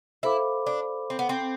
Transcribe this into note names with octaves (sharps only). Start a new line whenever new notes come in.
E4 A4 C5 F5 B5 D6
D4
C4
B3
C4